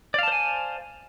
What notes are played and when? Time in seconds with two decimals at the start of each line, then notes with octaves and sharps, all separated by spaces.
0.14 D5
0.19 F5
0.23 A5
0.28 C5
0.32 G#5